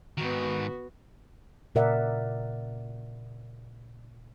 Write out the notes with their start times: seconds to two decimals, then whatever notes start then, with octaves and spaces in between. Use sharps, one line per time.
0.18 G#2 D#3 B3 F#4
1.75 A#2 C#3 A#4 D5 E5 F#5